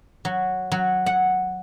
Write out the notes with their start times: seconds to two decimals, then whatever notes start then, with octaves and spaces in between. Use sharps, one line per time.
0.25 F#3
0.72 F#3
1.06 F#5